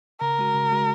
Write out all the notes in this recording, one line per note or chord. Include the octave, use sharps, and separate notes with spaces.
C#3 A#4
G#3 F#4
C#3
G#3 F#4